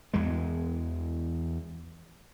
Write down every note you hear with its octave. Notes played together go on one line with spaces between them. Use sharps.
E2 E3 G#3